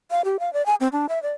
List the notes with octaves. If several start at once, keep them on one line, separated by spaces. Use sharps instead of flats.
F5
G4
F5
D5
G#5
C4
D4
E5
D5